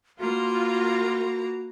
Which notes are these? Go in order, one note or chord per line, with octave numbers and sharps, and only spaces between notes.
A#3 F4 F#4 B4 A#5